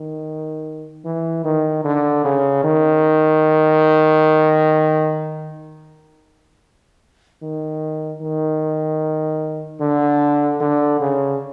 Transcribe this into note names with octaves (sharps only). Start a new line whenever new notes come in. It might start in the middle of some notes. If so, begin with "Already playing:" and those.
Already playing: D#3
E3
D#3
D3
C#3
D#3
D#3
D#3
D3
D3
C#3